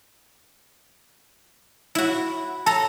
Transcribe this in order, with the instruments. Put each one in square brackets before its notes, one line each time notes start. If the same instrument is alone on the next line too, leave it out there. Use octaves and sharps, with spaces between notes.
[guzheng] E4 F#4
[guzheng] A4 A#5 [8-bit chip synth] A5